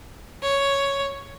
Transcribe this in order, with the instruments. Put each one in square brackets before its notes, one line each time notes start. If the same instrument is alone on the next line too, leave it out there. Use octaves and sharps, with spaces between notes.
[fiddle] C#5